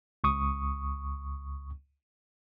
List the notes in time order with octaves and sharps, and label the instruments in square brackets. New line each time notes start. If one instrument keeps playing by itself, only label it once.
[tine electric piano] C#2 C#6 D#6